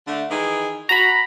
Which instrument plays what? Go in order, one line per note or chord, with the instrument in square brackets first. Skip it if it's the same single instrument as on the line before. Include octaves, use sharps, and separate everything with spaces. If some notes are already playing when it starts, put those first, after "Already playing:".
[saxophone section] D3 A3
D#3 E3 G#4
[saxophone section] F#4 [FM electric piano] A#5 B5